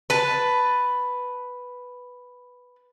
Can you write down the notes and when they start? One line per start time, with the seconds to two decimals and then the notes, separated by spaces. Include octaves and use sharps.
0.10 B4 A5